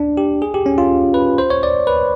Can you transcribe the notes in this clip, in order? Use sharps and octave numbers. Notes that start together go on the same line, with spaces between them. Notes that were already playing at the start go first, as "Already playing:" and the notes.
Already playing: D4
G4
G#4
G4
C#4
F4
B4
C5
C#5
D5
B4